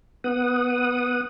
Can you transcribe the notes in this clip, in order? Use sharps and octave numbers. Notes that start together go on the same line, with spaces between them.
B3 F#5 D#6